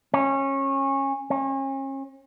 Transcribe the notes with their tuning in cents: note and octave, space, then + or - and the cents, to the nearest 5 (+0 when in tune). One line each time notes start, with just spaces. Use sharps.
C#4 -20
C#4 -40